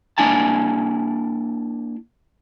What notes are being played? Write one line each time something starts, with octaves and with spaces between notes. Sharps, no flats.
A#3 D4 E4 G#5 A5